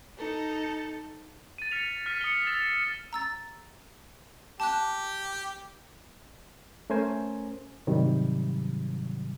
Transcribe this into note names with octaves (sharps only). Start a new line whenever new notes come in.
D#4 A4
A6 D#7
F6 B6 C#7 F7
F6 B6 D#7
D#6 C#7 G7
E6 A6 E7 F7
A#5 E6 A6
G4 A5 F#6
A3 C#4 A#4 C5 G#5
G#2 C3 D#3 F#3 G3